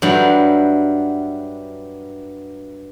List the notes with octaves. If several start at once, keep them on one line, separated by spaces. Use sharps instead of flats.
G2 F#3 G3 E4